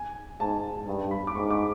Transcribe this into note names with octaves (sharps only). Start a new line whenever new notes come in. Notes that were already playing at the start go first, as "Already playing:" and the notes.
Already playing: G#5
G#2 A5
G2
B5
D6
G#2 C#6
D6